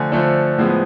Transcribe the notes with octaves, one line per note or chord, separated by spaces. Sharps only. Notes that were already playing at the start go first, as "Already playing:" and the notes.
Already playing: D3 F3 A3 G#5
D3 F3 A3
A2 F3 G#3 B3